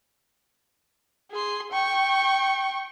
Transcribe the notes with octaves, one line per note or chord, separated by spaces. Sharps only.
G#4 C6
G5 C#6